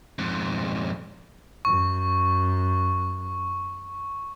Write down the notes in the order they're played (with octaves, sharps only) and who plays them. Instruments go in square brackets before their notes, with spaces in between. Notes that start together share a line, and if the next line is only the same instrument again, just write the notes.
[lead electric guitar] F2 G#2
[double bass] F#2 [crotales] C#6